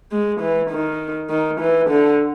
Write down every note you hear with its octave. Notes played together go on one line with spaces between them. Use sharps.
G#3
E3
D#3
D#3
E3
D3